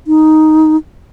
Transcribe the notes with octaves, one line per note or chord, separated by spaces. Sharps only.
D#4